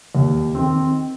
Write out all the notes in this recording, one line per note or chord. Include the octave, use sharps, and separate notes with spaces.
D#2
D#3 C4